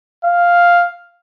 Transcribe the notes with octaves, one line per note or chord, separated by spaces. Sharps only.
F5